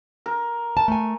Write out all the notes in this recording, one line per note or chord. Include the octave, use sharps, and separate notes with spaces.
A#4
A5
A3 G#5